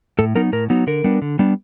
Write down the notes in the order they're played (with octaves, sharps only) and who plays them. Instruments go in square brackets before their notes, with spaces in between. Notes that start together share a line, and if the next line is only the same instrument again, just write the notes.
[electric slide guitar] A2 A4
F#3 B3 D#4 A#4
A2 A#4
F#3 B3 D#4
D3 A#4
G3 B3 D4
D3
G3 B3 D4